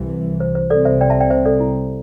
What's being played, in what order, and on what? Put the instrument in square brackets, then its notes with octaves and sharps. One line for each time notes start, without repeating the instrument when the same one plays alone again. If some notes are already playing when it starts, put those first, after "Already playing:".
Already playing: [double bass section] C2 C3 E3
[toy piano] C5
C5
[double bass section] C2 C3 G3 C4 [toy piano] A4 D5
[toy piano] C5 E5
D5 G5
E5 A5
D5 G5
C5 E5
A4 D5
E4